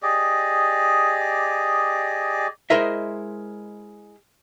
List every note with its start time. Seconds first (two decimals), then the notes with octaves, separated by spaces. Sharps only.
0.03 G4 G#4 D5 D#5
2.70 G#3 E4 A#4 C5 D#5 E5